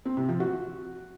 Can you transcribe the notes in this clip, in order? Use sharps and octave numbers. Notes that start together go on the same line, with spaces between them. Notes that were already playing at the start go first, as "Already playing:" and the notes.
C4
C3
F3
F#4